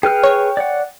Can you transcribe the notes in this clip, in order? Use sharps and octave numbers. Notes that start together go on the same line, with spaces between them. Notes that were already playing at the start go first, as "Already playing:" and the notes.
G#4 B4 G5 F6
C#5
D5 F#5